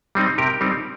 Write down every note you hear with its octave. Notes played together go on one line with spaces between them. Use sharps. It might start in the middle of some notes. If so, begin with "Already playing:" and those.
G3 C4 D#4
C3 G4 A#4
G3 C4 D#4